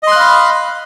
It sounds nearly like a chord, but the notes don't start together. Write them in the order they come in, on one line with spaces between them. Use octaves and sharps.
D#5 C6 F#6 F5 B5